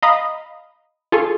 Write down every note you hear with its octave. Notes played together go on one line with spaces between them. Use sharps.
D#5 F5 A#5 B5 D#6
F4 G#4 A4 G#5 C#6